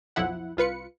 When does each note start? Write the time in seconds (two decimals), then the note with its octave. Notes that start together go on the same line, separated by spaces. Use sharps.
0.16 B1 F2 F3 E4 F#5
0.57 C2 F4 B4 C#7